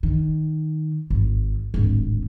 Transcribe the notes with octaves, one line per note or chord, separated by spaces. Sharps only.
D#3
G#1
D1 G#1